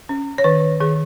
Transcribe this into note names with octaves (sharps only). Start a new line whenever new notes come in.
C#4
C#5
D#3 B4
D#3 G#4